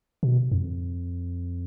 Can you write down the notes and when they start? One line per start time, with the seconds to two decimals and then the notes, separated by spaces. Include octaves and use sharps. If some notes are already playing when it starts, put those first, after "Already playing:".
0.23 B2
0.52 F2